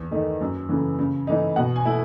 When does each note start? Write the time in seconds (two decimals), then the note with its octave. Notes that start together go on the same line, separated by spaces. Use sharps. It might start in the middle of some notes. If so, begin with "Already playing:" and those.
Already playing: E2
0.11 D#3 A3 D#4
0.41 F#2
0.69 C#3 E3 A3
0.99 C#3
1.27 E3 A3 D#4
1.56 B2 F#5
1.76 G#5
1.85 A3 E4